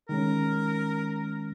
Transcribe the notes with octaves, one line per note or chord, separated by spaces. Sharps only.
D#3 G#3 C#4 A#4